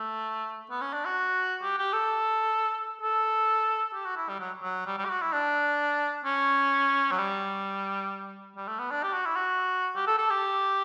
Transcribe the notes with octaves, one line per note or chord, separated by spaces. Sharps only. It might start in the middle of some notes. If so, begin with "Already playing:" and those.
Already playing: A3
B3
C#4
D4
F#4
G4
G4
A4
A4
G4
F#4
E4
G3
F#3
F#3
G3
G3
G4
F#4
E4
D4
C#4
F#3
G3
G3
A3
B3
D4
G4
F#4
E4
F#4
G4
A4
A4
G4